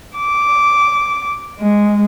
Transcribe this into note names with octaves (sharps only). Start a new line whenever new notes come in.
D6
G#3